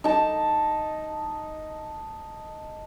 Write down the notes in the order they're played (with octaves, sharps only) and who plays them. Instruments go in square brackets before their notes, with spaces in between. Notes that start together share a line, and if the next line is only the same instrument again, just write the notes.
[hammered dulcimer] D#4 A5